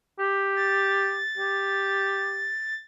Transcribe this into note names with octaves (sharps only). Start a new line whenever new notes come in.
G4
A6
G4